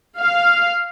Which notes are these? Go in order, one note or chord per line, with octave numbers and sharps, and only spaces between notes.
F5